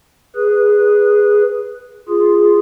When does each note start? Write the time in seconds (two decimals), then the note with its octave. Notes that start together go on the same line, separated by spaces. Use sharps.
0.36 G#4 B4
2.08 F4 G#4